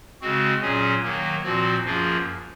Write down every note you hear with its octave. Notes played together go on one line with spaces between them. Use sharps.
C#3 G#3 C4 F#4
A#2 F#3 C#4 G#4
D#3 F#3 A#3
A#2 F3 C4 F#4
F#2 F3 A#3 F4 G#4